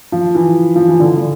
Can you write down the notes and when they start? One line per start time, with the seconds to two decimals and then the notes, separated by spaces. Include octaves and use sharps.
0.12 F3
0.35 E3
0.76 F3
0.88 E3
1.00 D3
1.17 D3